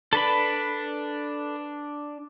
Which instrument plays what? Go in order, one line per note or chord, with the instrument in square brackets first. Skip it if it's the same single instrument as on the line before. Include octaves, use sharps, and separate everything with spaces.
[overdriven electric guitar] D4 [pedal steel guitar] A4 B4 B5